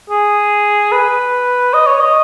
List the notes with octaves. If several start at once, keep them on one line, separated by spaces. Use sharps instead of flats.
G#4
B4
D#5
C#5
D#5